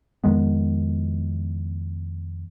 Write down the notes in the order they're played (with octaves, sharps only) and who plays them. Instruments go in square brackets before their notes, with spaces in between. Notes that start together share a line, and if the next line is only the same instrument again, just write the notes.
[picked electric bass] F2 D#3 G#3 B3